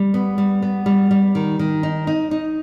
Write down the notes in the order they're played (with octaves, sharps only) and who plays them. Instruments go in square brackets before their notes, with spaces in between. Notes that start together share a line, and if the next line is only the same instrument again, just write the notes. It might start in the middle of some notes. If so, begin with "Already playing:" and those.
Already playing: [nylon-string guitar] G3
B3
G3
B3
G3
G3
D#3
D#3
D#4
D#4
D#4